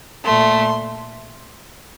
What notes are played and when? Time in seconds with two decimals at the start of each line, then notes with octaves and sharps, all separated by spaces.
0.24 A#2 A3 C6